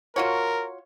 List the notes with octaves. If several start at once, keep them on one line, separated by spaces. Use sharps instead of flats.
F4 F#4 A#4 C#5